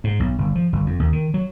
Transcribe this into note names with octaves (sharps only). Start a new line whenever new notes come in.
G#2
B1
G1
F3
G1
F2
D#2
D#3
F#3